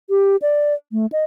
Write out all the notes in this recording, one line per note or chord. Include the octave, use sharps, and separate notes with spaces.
G4
D5
A3
D#5